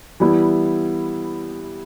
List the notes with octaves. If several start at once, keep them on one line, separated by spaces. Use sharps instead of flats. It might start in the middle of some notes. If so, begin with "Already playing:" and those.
E3 G3 B3 E4